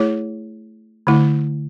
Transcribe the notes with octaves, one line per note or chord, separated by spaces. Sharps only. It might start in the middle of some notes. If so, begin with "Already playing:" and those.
Already playing: A3 E4 G#4 C#5
D3 A3 E4